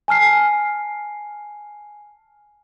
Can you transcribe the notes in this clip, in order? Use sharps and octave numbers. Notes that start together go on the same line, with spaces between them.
G#5 A5 F6 C7